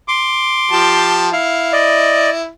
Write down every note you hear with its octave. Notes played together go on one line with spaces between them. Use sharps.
C6 D6
F3 G4 A5
E4 F5
D5 D#5